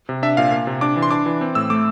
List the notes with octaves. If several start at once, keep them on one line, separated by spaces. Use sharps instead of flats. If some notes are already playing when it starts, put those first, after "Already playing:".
C3
D4 E5
A#2 F5
A#3
C3
D4 D6
E3
C6
D4 D6
E3
C4
A2 E6
A3 D6